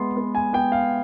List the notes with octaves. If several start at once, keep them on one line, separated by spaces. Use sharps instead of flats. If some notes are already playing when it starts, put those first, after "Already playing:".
Already playing: G#3 B3 C6
B3
G#5
B3 G5
F5